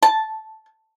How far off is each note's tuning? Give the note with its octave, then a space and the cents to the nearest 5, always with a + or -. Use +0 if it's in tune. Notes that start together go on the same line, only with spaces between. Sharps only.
A5 -5